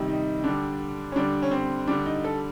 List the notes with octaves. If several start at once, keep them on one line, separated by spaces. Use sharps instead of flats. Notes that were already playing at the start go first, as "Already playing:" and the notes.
Already playing: C3 D#3 G3
D#4
D3 G3 D4
C#4
D3 G3 D4
C#4
C4
D3 G3 D4
D#4
A4